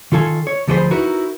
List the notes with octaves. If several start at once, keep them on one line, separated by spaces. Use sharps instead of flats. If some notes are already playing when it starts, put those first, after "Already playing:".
D#3 F4 A4 G#5
C#5
D2 F3 F#4 G#4 C5 B5
D#4 E4 F#4 A#4 B4